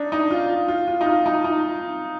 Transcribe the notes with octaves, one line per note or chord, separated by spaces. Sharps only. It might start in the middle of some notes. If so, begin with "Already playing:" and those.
Already playing: D4 D#4
D#4
F4
F4
F4
D#4
F4
D#4
D#4